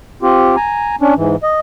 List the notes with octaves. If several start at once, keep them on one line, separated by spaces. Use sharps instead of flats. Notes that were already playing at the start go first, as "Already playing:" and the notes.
C4 F4 G4
G#5 A#5
C#4 D4
G#2 E3
D#5